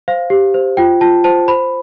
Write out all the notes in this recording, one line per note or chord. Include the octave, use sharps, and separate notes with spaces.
C5 F5
G4
C5
F4 G5
F4 A5
C5 A5
C5 B5